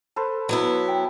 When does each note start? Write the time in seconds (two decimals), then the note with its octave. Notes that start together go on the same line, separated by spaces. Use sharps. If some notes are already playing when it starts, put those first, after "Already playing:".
0.16 A4 B4 C5
0.49 F#3 B3 E4
0.88 G5